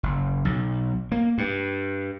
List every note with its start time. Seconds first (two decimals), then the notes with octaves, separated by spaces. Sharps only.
0.03 F#1
0.45 B1
1.12 A#3
1.38 G2